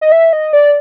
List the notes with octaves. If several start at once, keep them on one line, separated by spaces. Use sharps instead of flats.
D#5
E5
D#5
D5